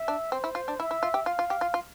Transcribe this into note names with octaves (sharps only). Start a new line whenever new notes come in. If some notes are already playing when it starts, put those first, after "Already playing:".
Already playing: E5
D4
C4 C5
E4
F4
D4
E4 E5
E4
F4
G4
F4 F5
F4
G4
F4
F4